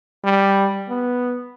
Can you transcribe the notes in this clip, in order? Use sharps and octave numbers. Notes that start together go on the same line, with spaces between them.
G3
B3